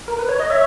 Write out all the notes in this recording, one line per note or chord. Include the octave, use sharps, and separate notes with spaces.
A#4
B4
C#5
D#5
C#5 E5